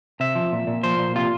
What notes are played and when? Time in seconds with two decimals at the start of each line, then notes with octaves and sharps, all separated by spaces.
0.20 C3 E5
0.35 F3
0.52 A#2
0.67 A#2
0.83 F3 C5
0.99 A#2
1.15 C3 F4